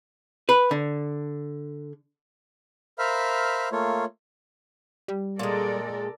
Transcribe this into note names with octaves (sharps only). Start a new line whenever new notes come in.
B4
D3
A#4 C5 E5 F5 B5 F6
A3 A#3 F4 C#5
G3
A#2 G#3 A4 A#4 D5